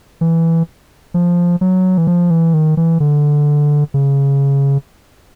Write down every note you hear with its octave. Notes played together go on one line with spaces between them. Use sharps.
E3
F3
F#3
E3
F3
E3
D#3
E3
D3
C#3